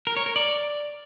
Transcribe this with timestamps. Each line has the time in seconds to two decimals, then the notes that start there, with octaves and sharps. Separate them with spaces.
0.07 A#4
0.17 C#5
0.26 A#4
0.36 D5